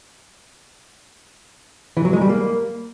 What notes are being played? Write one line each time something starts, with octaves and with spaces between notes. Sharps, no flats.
E3
F#3
G#3
G3
A#3